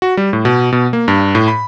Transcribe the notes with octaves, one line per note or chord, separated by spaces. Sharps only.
F#4
G3
A2
B2
B2
A#3
G2
A2
B5